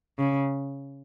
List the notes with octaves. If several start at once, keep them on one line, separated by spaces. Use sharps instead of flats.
C#3